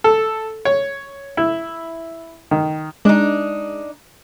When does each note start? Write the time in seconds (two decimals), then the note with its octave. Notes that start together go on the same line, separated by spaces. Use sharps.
0.04 A4
0.65 C#5
1.37 E4
2.51 D#3
3.05 G#3 D4 D#4